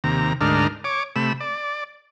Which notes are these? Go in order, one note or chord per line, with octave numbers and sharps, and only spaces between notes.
D#2 C3 A#5
D2 G#2 D4 D#4 A#4 F6
C#5 D6
C3 A3 B5 E6
D5